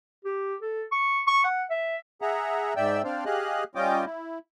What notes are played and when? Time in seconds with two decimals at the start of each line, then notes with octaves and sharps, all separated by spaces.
0.25 G4
0.61 A4
0.92 C#6
1.27 C#6
1.44 F#5
1.70 E5
2.22 G#4 E5 F#5 A#5
2.76 G#2 D5 E5 G5 E6
3.04 C4 D4 C5 D5 F5
3.26 G4 G#4 D#5 F5 F#6
3.75 G3 C#4 F4 D#5 G5 D6
4.05 E4